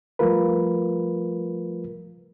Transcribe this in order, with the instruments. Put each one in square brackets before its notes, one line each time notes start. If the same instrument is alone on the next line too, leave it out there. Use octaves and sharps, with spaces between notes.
[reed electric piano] F3 G3 A3 F4 A#4 B4